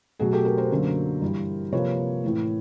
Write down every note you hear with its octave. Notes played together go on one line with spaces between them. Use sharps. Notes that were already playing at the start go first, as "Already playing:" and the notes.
B2 F#3 A3 F#4 G#4
G4 A4
G#4 A#4
A#4 C5
F#2 D3 F#3 A#3
G2 E3 G3
C3 F3 A#3 B4 C#5
A2 E3 A3